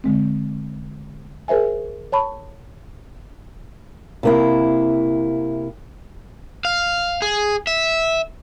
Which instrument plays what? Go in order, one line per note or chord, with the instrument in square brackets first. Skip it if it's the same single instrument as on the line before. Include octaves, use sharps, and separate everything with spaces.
[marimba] D3 G#3 C4
G#4 A#4 C5 E5 G#5
C#5 A5 B5 C#6
[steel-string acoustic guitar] C3 A#3 E4
[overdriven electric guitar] F5
G#4
E5